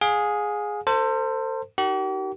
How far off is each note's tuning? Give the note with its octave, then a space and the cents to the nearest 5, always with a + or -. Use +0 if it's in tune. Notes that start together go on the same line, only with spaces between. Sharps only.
G#4 +0 F5 +40
A4 +40 C5 +0
D#4 +0 G4 -45 A#4 -10